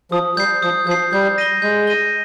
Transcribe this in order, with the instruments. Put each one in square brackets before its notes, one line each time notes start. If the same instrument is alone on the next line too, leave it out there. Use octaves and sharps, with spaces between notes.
[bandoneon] F3 [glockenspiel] D#6
[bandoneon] G3 [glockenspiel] G6 C7
[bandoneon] F3 [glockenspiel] D#6
[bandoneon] F3 [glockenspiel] G6 C7
[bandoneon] G3 [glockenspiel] G6
[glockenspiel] A#6 D#7 G7
[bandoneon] G#3 [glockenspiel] G6
[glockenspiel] A#6 D#7 G7